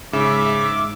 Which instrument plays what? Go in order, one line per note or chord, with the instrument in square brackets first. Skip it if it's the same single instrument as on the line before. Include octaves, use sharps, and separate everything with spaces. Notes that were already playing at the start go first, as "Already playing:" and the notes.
[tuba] G#2 [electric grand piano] C#3 [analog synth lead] E5 [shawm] D6